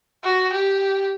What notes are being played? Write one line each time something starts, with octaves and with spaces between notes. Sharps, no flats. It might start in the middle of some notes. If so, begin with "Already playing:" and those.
F#4
G4